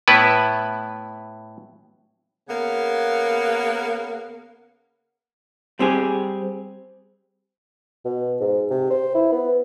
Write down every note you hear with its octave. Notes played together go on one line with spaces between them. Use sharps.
A2 B3 E4 B4
C#3 A#3 B3
G3 C4 G4 G#4
B2
G#2
C3
C5
E4
B3